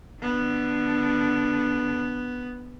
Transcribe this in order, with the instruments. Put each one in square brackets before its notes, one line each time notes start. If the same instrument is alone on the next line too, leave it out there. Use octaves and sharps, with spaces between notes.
[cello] D3 [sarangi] B3